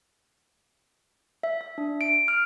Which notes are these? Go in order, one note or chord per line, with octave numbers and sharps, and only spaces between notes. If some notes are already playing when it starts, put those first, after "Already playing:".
E5
E5
D4
D7
F6